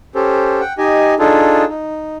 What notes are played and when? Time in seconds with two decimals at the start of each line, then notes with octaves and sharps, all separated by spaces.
0.15 C#4 G4 A4 C5
0.61 F#5 G5
0.78 D#4 G4 D#5 G#5
1.19 D4 D#4 F4 G#4 A4
1.69 D#4